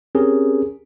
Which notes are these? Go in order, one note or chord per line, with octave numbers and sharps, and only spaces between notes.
C4 C#4 G4 G#4 A#4